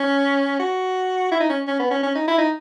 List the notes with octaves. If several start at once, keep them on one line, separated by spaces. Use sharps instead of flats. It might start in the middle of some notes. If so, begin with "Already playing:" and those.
Already playing: C#4
F#4
E4
D#4
C#4
C#4
B3
C#4
C#4
D#4
E4
D#4